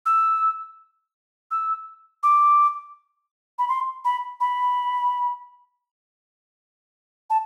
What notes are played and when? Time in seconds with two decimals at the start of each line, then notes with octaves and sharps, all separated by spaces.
0.06 E6
1.51 E6
2.23 D6
3.59 B5
3.69 C6
4.05 B5
4.40 B5
7.30 A5